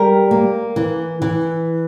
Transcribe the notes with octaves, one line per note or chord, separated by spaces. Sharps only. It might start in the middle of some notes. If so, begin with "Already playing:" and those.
Already playing: G3 A#4
A#3
E3
E3